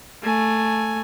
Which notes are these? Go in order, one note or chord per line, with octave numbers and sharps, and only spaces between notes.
A3 G#5